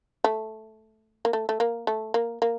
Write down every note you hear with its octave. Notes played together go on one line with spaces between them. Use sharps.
A3
A#3
A3
A3
A#3
A3
A#3
A#3